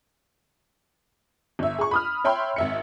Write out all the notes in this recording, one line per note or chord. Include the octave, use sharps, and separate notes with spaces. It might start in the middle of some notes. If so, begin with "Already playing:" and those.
G1 E5
G#4 C#6
B5 D#6 F6
C#5 E5 G5 B5 C6
G#1 E5 C#7